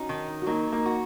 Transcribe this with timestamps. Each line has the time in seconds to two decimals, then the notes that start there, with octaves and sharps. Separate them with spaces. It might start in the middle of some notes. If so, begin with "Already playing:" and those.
Already playing: C#4 D#4 F#4
0.09 D#3
0.42 F#4
0.47 F#3 A#3 D#4
0.72 A#3 D#4
0.86 F#4